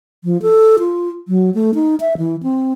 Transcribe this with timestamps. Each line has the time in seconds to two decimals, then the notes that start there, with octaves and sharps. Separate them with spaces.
0.24 F3
0.42 A4
0.79 F4
1.28 F#3
1.54 A3
1.75 D#4
2.00 E5
2.18 E3
2.43 C4